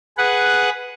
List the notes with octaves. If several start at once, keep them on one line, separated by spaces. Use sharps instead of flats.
G#4 B4 F#5